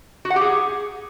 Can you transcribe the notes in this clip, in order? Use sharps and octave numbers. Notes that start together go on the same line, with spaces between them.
F#4
F#5
G4
G#4